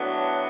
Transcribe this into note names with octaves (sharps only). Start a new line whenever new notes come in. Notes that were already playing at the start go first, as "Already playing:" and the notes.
Already playing: A2 F#3 B3 D4